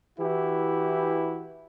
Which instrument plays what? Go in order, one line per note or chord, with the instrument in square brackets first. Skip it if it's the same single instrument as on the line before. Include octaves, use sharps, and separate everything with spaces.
[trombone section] E3 E4 F#4 G4